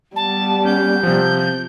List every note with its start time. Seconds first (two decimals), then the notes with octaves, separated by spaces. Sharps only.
0.16 G3 B3 A5
0.65 C#4 G6
1.03 C3 F3